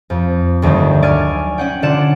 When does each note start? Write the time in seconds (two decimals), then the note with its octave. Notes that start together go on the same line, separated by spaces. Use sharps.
0.10 F2
0.62 G1 D2 D#3 F#3 G3
1.02 D5 G#5 C#6 F6
1.58 C#4 F#5 G5
1.82 D3 F4 D5 F#5 E7